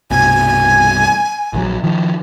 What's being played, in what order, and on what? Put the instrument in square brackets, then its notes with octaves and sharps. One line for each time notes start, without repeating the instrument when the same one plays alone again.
[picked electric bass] C2 G2 B2 [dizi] G#5
[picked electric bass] A#1 D#3 F#3
D#3 F3